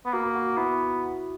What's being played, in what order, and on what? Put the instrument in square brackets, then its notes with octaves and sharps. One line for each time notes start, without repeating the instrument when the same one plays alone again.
[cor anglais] B3
[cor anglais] A#3 [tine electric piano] F#4
[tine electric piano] F#4
[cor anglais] B3 [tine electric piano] E4